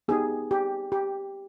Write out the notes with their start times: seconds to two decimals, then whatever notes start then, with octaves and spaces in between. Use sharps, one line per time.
0.08 B3 D#4 G4 G#4
0.51 G4
0.92 G4